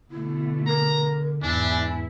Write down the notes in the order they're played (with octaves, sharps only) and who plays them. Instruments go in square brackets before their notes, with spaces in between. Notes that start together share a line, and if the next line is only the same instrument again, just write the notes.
[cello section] B2 A3 [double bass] D3 [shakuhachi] E4
[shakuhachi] A#4 [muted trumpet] A#5
[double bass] E2 G#2 [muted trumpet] D4 [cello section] E4 [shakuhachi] G#5